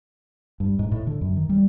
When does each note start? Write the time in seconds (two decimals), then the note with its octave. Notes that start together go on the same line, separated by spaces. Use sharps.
0.60 G2
0.79 G#2
0.92 A2
1.07 D3
1.21 F#2
1.37 D#3
1.49 G3